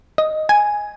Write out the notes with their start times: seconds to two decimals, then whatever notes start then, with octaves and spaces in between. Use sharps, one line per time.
0.18 D#5
0.49 G#5